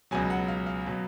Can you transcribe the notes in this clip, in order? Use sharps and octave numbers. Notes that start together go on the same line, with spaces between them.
C#2 B2 F#3 G#5
F#5
F5
F5
B2 F#3